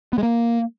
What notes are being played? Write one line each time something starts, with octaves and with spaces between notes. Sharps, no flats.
B3
G#3
A#3